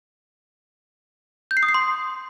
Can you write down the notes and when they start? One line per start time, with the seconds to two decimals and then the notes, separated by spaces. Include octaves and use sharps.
1.51 G6
1.57 C7
1.63 D#6
1.69 C7
1.74 C6